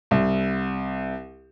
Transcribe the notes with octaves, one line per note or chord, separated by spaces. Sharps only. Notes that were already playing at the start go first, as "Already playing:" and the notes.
C2